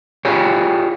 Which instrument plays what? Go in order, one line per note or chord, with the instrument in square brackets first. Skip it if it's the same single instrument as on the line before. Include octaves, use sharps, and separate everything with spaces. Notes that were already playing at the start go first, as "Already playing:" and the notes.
[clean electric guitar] F4 G4 G#4 C#5